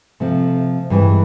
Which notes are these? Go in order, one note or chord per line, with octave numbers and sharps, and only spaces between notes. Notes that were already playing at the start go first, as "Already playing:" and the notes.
C3 F3 A3 C4
G2 E3 G#3